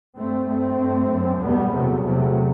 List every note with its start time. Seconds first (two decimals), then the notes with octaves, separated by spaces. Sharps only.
0.17 G2 A3 C4
0.48 G2 A3 C4
0.80 G2
1.10 F#2
1.41 E2 B2 G3 B3
1.72 E2 C3 F#3 A3
2.03 E2 C3 F#3 A3